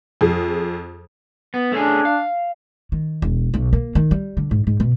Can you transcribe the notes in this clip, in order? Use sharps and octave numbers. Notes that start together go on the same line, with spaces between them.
F2 G#4
B3
A3 C#4 D4 G#4
F5
D#3
E1
B1
A#3
D#3
G3
D3
G#2
G#2
B2